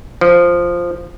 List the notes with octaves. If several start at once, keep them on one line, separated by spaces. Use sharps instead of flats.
F3